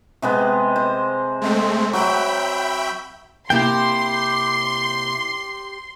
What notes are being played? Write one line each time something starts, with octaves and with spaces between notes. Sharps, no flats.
C3 G#3 B3
C5
G#3 A3 C4
F#3 E5 G5 B5
C3 A#3 E4 G4 G5 C6